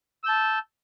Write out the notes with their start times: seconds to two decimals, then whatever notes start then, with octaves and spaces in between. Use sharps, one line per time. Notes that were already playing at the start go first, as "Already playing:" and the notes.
0.24 E6
0.26 G6
0.29 A5